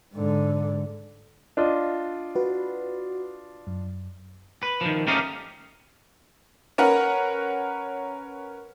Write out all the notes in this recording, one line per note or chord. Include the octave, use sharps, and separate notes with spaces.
G#2 D3
D4 F4 D#5
F#4 B4
F#2
B4
D#3 F3
A3 C#4 G4 A#4 D#5 F5
C#4 A#4 B4 F#5